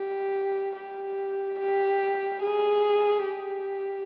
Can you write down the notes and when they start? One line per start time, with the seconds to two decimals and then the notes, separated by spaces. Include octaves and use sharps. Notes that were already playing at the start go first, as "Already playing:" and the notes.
Already playing: G4
0.76 G4
1.59 G4
2.42 G#4
3.25 G4